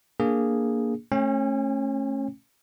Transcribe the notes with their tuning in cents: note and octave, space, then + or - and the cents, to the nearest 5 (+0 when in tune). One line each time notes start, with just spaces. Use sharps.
A#3 +0 D4 -5 G#4 +0
A3 +0 C#4 -25 G5 +40